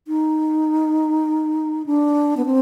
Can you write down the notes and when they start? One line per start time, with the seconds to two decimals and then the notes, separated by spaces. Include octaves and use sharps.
0.08 D#4
1.86 D4
2.37 B3
2.46 C4